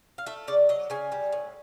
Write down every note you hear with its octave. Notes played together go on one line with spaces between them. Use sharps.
F5
A3 E5
C#3 D5
F#3 D#5
C#3 G#5
G3
A2